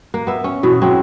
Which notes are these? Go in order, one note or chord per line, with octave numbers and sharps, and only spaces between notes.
A#3
B3 E5
C#4
B2 E3 E4
F#3 G#3 C4 C#4